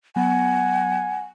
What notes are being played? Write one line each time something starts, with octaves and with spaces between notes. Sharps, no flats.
F#3 B3 F#5 G#5